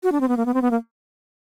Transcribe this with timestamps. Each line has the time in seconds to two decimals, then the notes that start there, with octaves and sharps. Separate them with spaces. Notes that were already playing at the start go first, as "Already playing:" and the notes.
0.03 F#4
0.12 D4
0.21 C4
0.28 B3
0.37 A#3
0.46 B3
0.54 C4
0.62 B3
0.71 A#3